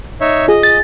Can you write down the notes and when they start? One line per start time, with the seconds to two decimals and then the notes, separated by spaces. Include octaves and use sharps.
0.21 D#4 C#5 E5
0.48 F4 G#4 D#5
0.63 A6